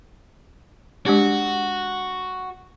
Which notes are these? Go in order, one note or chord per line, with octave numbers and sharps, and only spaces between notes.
G#3 D4 F#4 G4